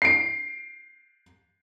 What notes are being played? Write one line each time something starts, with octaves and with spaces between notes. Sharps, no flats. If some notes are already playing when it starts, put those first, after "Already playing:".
C7 D7